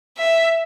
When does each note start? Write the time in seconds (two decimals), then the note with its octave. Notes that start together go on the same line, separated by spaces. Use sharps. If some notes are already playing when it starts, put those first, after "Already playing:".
0.18 E5